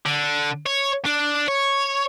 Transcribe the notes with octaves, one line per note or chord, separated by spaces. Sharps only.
D3
C#5
D4
C#5